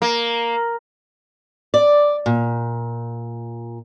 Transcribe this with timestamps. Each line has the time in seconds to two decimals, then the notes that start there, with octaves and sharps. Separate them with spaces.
0.02 A#3
1.74 D5
2.26 A#2